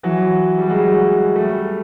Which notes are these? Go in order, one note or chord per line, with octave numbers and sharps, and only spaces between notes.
E3 F#3
G3
F#3 G#3
G3 A3